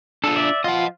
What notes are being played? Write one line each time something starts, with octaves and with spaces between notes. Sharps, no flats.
D4 F4 A4
D5 E5
F3 F4 D#5 F#5